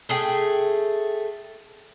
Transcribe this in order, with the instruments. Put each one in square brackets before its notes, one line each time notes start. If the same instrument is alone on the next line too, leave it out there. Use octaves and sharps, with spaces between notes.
[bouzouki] A3 G#4 G5